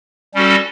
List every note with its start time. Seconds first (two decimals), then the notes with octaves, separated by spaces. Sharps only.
0.34 G3 C#4 F#4 A4